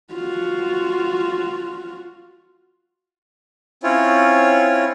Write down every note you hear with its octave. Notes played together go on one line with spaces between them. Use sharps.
F4 F#4
C4 C#4 E4 F4 C#5